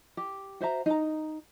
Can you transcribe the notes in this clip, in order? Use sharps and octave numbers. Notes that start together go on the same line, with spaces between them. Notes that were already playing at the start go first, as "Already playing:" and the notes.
G4
F#4 C5 E5 A#5
D#4 A#5